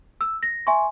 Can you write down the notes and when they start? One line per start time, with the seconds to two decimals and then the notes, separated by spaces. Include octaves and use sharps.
0.21 E6
0.43 A#6
0.67 E5 G#5 C6 C#6